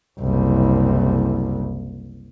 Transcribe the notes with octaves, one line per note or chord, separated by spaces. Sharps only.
F#1 C2